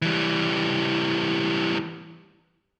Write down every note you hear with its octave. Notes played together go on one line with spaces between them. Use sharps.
E3 G3